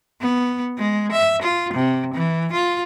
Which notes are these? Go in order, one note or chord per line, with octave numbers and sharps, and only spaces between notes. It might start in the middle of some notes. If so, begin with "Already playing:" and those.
B3
G#3
E5
F4
C3
E3
F4